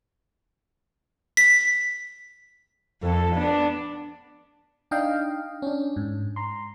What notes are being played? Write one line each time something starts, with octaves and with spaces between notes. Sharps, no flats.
B6
F2 A4
B3 D4
D4 D#4 D#5 F5 G5
C#4 D4
G#2
A#5 C6